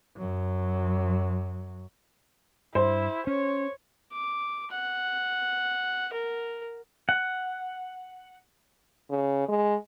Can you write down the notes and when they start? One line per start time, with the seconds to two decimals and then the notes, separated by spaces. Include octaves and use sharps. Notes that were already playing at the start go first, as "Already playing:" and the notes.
0.17 F#2 F#3
2.75 G2 E4 C5
3.27 C#4 C#5
4.12 D6
4.71 F#5
6.13 A#4
7.09 F#5
9.10 C#3
9.49 G#3